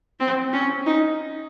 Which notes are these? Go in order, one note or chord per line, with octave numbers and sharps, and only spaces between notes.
C4
C#4
D#4